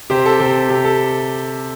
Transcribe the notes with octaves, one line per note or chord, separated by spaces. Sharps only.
C3 G4 C5
A4
C3 G4 C5
C3 G4
A4